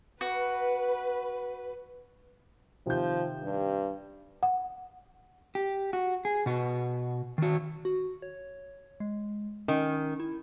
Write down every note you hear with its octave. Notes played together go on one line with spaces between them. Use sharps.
F#4 B4
C3 D#3 F3 G6
G2
F#5
G4
F#4
G#4
B2 F#4
D#3 F#4
F#4
C#5
G#3
D#3 C#4
E4